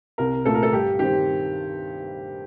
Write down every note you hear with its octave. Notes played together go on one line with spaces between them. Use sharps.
C2 A#4
A#2 A3 A4
A#4
A4
G2 G4
D#3 G3 C4 G4